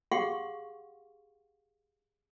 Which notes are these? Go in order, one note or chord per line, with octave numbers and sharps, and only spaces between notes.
G4 G#4 F5 F#5 C6 C#6